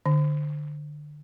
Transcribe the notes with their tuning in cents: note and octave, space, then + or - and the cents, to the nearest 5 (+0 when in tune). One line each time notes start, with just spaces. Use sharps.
D3 +20